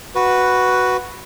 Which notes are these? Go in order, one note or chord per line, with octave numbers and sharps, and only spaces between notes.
F#4 B4